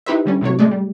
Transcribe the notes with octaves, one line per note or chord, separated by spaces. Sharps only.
D#4 E4 G4 B4 C5 E5
D3 G3 C#4
A2 C3 F#3 C#5
G#3 A3 D5
G3